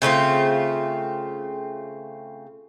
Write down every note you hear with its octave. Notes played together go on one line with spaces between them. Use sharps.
C#3 A3 C4 F4